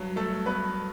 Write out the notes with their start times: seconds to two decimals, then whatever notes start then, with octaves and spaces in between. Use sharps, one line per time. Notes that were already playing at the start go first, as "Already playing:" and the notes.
Already playing: G2 F#3
0.16 A3 A4
0.46 B3 B4